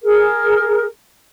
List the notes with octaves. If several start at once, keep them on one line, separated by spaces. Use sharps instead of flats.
G#4 A#4